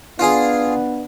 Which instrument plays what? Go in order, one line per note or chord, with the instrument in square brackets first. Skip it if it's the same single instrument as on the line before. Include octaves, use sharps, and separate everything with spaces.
[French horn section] B3 D4 [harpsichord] F4 G#4